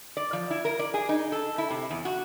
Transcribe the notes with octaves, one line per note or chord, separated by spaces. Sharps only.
D5
F3
E4
A#4
D5
G#4
D#4
A4
E4
C3
E2
F#4